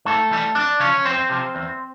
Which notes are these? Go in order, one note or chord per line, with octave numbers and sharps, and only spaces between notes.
G#2 A3 A4
E3 G3
F2 D4 D5
C#3 F3 C#4 C#5
F2 C4 C5
C3 F3
E2